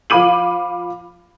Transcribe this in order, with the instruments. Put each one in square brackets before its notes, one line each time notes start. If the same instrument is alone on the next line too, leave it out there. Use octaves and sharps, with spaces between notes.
[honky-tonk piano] F3 F5 B5 D6 D#7 F#7